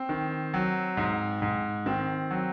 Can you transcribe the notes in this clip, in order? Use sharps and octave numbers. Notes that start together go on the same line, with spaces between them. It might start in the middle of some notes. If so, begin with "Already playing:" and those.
Already playing: C4
D#3
F#3
G#2
G#2
D#3 C4
F#3